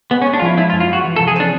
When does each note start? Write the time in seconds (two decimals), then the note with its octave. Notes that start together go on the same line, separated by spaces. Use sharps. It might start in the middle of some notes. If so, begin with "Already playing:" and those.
0.11 G#3 B3
0.22 C#4
0.26 G#3
0.33 D4
0.39 F4
0.42 F3 E4
0.57 G#3 E4
0.70 F4
0.73 F#2
0.80 F4
0.89 F3 F#4
1.04 E3
1.16 A4
1.21 C3
1.28 G#4
1.36 C4 D4